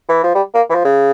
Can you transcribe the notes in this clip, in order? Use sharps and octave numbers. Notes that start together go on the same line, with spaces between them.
E3
F3
G3
A#3
E3
F3
C#3